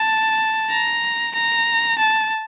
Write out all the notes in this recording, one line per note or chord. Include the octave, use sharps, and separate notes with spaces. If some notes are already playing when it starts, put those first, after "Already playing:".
Already playing: A5
A#5
A#5
A5